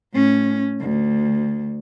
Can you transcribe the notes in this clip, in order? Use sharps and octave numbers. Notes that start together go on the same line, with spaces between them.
A2 C#4
D2